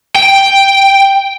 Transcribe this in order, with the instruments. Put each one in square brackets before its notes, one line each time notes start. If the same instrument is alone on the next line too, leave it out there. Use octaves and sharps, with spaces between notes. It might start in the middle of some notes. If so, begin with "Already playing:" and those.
[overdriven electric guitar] G5